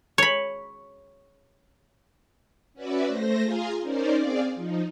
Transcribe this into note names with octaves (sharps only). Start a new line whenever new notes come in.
C#5 B5
C#4 F#4 B4 D5 E5
A3 C5 A#6
F4 G#4 F5 G#5 A#5 C6
C#4 D#4 A#4 C5 D5
C4 G#4 D5 F5
F3 D#4